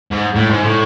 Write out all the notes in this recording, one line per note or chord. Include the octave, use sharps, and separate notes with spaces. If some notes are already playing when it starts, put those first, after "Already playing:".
G#2
A2
G#2
A2